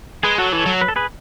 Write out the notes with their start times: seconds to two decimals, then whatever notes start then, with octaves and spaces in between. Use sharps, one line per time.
0.23 G#3 G#4 B4
0.38 F#3 F#4 A4
0.52 E3 A4 C#5
0.66 F#3
0.81 B4
0.88 A4
0.96 G#4 B4